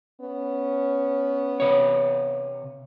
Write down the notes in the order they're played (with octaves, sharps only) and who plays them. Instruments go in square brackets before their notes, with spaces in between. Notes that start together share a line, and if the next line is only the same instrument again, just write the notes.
[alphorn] B3 [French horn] C#4
[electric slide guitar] C3 C#5